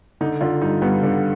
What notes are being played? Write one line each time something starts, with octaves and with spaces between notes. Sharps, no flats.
D3 D#4
D3 F4
G2 D#4
G2 B3
D3